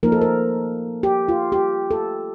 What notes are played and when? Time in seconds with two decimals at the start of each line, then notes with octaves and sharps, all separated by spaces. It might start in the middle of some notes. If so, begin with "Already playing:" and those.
0.03 F3 A#3 D#4 A#4
0.12 A4
0.21 A#4
1.03 G4
1.28 F4
1.52 G4
1.91 A4